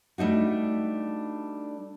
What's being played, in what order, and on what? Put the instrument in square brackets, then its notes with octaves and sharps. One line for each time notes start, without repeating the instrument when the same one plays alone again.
[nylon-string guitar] G3 A3 D4 D#4 F#4